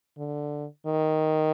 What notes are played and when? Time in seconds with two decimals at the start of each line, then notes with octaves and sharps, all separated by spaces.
0.18 D3
0.86 D#3